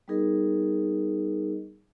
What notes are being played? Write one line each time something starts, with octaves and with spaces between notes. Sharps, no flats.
G3 B3 D#4 G#4 A#4 D#5